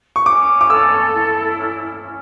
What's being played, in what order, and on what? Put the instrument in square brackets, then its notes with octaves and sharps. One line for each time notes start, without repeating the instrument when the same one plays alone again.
[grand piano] C#6
[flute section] C#4 [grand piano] D6
[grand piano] D6
[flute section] A4 [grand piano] E6
[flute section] E4
C#4
C#4